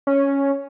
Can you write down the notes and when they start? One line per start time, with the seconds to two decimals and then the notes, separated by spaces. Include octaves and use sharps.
0.07 C#4